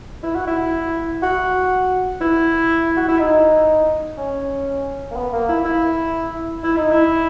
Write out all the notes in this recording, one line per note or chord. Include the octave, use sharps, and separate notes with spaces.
E4
F#4
E4
F#4
E4
F#4
E4
D#4
C#4
A#3
B3
A#3
E4
E4
E4
D#4
E4